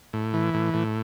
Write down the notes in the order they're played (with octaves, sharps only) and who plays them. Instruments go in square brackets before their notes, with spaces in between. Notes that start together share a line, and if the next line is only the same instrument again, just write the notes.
[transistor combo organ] A2
E3
A2
A2